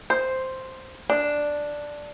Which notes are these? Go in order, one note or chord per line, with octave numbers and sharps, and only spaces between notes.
C5
D4